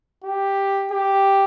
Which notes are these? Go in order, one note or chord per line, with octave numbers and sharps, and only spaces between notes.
G4
G4